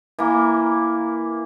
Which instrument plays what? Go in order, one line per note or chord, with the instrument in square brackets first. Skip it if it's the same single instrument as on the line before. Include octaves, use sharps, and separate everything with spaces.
[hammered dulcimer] E3 A#3